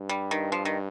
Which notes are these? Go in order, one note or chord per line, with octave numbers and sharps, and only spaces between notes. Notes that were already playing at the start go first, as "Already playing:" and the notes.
Already playing: G2
G3
D#3
F3
D#3